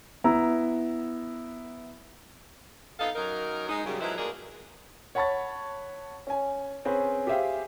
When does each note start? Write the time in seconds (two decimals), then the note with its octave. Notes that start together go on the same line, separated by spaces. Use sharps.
0.24 B3 E4 A#5
2.99 B3 D#4 A4 D#5 F5
3.15 F#2 F#3 D#4 A#4
3.69 G#3 D#4
3.85 F#2 C#3 G3
4.01 F3 F#3 G#3 E4 A#4 B4
4.17 D2 A#3 D4 G#4 A#4
5.15 C#5 F#5 A5 B5 C#6 A6
6.27 C#4 G#5
6.85 C4 C#4 G#4 B4
7.27 G4 G#4 C5 E5 F5 G5